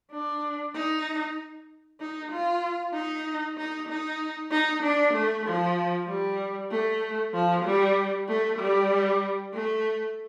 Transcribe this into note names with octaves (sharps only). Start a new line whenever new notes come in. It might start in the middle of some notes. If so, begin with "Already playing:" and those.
D4
D#4
D#4
F4
D#4
D#4
D#4
D#4
D4
A3
F3
G3
A3
F3
G3
A3
G3
A3